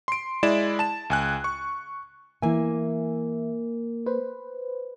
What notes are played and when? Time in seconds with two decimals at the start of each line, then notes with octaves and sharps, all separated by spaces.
0.08 C6 D7
0.43 G#3 E4 D5 E7
0.79 A5 E7
1.10 C#2 G#5 F#6
1.44 C#6
2.42 E3 A#3 E5 G#5
4.06 B4 C5